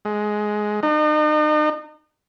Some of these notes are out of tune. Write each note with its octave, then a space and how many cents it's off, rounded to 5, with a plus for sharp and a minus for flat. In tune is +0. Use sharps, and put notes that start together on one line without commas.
G#3 +15
D#4 -40